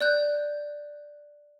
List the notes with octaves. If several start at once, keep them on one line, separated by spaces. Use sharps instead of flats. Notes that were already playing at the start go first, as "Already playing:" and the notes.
D5 F#6 G6